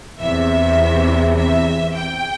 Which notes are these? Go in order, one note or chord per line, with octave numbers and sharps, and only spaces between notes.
E2 C3 E3 E5
E5
G5